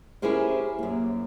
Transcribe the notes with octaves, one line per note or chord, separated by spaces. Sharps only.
C#4 E4 G4 G#4 A#4 C5
F#2 A#3